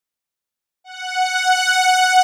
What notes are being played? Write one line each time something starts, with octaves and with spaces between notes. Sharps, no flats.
F#5